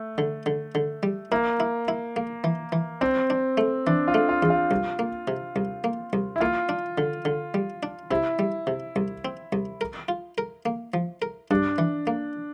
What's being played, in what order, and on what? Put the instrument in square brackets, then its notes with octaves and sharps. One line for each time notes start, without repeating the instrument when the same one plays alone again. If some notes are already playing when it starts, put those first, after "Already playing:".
Already playing: [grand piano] A3
[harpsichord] D3
D3
D3
G3
[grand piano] A#3 [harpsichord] E4
[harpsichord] E4
E4
A#3
E3
E3
[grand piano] C4 [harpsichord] D4
[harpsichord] D4
A3
[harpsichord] E3 [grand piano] D4
[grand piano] F4
[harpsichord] A3
[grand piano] F4
[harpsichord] E2
[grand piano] F4
[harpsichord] C2
A#3
C3
C2
A#3
C2
[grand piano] E4
[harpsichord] A#3 [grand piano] F4
[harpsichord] D4
D3
D3
G3
D4
[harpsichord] C3 [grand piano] E4
[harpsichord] G3
C3
C2
C4
C2
A#4
F4
A#4
A#3
F3
A#4
[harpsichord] G2 [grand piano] D4
[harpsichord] E3
A#3